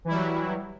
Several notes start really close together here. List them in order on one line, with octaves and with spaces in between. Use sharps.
E3 E4 G3 F#3